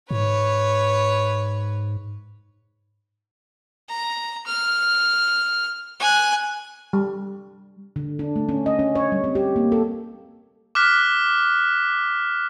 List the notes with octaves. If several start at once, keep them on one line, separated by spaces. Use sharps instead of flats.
G#2 B4 C#5
A#5
F6
G#5 F#6
G3
D3
D4
A3
C#4
D#5
C#4
C#5
G3
C4
G4
A#3
A4
D6 F6 F#6 B6